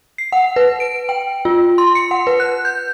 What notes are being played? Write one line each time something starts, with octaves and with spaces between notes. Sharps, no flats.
C7
F#5
B4
D7
G5
F4
C6
C#7
F#5
B4
F#6
G6